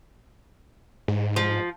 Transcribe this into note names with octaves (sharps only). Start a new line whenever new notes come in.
G#2
F3